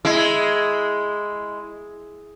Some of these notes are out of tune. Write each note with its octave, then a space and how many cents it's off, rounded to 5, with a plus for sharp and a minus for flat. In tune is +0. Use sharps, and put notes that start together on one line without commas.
G#3 +0 E4 +0